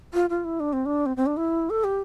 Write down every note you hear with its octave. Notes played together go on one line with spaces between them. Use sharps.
F4
F4
E4
D4
C4
D4
C4
C4
D4
E4
A4
G4